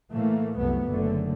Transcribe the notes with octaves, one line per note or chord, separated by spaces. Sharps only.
A2 E3 A3 A#3
C2 F#2 A3 B3
F#1 D3 A3